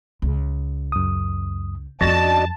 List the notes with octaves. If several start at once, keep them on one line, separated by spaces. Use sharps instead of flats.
C#2
F#2 D#6
F2 C#4 D4 F#4 D5 D#5 A5